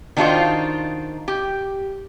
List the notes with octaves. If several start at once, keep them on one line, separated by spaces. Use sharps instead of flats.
D#3 D4 D#4 F4 F#4 C5
G4